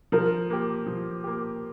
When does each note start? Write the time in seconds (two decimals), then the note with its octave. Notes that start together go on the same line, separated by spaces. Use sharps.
0.12 F3 A#4
0.50 A#3 G4
0.87 F3
1.24 A#3 G4